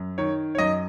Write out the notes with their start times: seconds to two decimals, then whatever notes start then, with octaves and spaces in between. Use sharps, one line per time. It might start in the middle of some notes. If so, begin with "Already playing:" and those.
Already playing: F#2
0.18 D#3 C#5
0.55 C#5
0.58 F#2 D#5